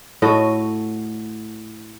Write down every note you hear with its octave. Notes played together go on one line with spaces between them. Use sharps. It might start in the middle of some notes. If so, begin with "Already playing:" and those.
A2 F#4 A4 D#5